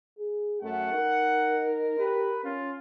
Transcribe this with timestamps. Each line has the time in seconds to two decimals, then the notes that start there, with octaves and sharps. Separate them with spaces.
0.18 G#4
0.62 F#2 A3 F#5
0.92 D#4 A#4
1.99 G4 B4
2.44 C#4 F4